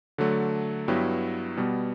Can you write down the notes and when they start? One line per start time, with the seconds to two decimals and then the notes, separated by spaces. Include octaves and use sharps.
0.18 D3 F#3 A3
0.88 G2 F#3 B3 E4 G4
1.57 B2 G3 B3